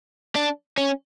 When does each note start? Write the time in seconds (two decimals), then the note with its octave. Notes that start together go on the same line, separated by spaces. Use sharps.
0.35 D4
0.78 C#4